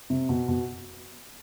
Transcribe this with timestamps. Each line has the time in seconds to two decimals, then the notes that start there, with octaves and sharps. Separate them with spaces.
0.10 C3
0.29 B2
0.48 B2